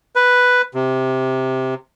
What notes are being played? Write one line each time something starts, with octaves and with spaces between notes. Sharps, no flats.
B4
C3